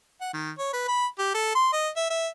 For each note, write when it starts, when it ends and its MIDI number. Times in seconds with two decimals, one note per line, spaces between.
0.21 0.30 78
0.34 0.51 51
0.58 0.71 73
0.73 0.85 71
0.88 1.06 83
1.18 1.31 67
1.34 1.51 69
1.55 1.69 84
1.73 1.89 75
1.96 2.08 76
2.10 2.28 76